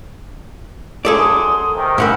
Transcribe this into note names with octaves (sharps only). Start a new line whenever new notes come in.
F#2 G#4 A4 D5 C6 D#6
C3 D#3
G#2 A#3 C4 F#5 B5